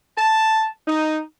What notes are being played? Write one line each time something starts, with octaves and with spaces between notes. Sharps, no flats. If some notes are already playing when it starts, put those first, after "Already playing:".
A5
D#4